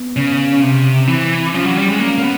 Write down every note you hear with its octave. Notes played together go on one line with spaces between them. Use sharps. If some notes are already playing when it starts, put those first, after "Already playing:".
Already playing: B3
C#3
C3
E3 C4
F3 C#4
F#3
G3
G#3
A#3
A#3
B3